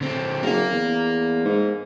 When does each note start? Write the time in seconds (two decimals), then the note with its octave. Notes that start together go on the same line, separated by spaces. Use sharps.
0.01 D3 C4
0.43 F#1 A#4 F5
0.72 E2
1.45 G#2